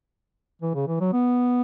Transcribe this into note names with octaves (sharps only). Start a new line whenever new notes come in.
E3
C#3
E3
F#3
B3